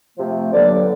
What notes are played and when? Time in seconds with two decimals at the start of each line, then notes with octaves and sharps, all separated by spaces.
0.18 C3 F3 A3
0.52 G2 D3 F#3 A#3 D5